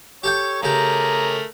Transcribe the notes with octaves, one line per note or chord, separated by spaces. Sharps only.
G4 A4 C#5 G5
C#3 A3 G4 G#4 A#4 A#5